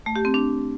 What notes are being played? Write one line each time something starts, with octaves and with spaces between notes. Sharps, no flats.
A3
G4
C4
D4